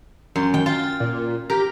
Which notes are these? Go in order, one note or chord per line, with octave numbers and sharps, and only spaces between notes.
F#2 C6
D#3 G5
F4 A6
A#2
G4 A#4